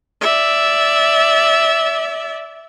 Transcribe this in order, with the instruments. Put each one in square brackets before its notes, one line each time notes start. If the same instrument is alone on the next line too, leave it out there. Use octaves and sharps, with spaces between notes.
[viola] D5 E5